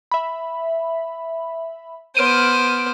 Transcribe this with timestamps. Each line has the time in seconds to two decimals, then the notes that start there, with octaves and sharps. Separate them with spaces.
0.11 E5 B5
2.17 B3 C5 F6 D7 D#7